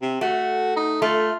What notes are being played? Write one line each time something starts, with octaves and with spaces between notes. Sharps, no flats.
C3
A3 F#4
D#4
A3 F4